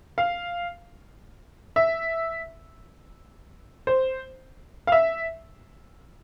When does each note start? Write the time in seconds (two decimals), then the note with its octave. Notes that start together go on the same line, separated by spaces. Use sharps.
0.18 F5
1.76 E5
3.87 C5
4.87 F5
4.92 E5